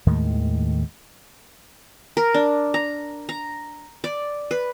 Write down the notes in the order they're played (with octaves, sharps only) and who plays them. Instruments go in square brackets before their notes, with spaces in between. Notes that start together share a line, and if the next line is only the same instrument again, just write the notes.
[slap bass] D#2 A2 D#3 G#3
[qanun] A#4
D4
A#5
A#5
D5
B4